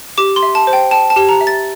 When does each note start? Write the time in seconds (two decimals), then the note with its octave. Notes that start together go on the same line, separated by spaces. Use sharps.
0.18 G4 D6
0.36 C6
0.43 E5
0.55 A5
0.67 C5
0.73 G5
0.91 G5 A5
1.10 A5
1.16 G4
1.29 A#5
1.41 E5
1.47 A6